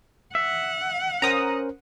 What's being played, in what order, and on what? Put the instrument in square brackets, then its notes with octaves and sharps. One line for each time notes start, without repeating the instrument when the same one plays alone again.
[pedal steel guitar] E5 [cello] F#5
[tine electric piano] C#4 A#4 C5 [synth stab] A#5 D#6